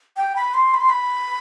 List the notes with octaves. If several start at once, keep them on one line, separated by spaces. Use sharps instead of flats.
G5
B5
C6
B5
C6
B5